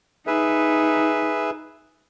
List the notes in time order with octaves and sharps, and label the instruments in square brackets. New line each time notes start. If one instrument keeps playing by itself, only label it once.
[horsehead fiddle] D#4 [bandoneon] G#4 B4 E5